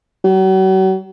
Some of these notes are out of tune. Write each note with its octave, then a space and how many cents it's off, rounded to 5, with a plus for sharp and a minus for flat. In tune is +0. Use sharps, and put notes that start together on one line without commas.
F#3 +40